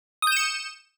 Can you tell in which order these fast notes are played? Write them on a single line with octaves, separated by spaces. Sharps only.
D#6 G6 E7 C#7